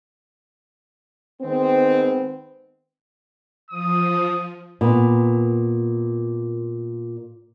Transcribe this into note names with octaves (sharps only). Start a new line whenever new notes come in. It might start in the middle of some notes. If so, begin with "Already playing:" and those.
D#3 G#3 B3 C4
F3 D#6
A#2 B3